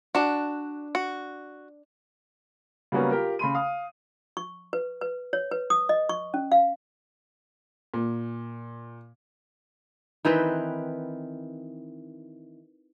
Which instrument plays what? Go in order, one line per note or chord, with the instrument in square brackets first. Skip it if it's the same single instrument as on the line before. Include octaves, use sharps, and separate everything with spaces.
[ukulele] D4 A5 [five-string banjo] F#4
[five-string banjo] F#4
[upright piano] C#3 F#3 G3 A#3 B3 C#4
F4 G4 A#4
C#3 B5 C6 D#7
F5 D#6
[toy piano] C#6
B4
B4
C#5
B4
D#6
D#5
C#6
C#4
F5
[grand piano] A#2
[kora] D#3 E3 C4 B4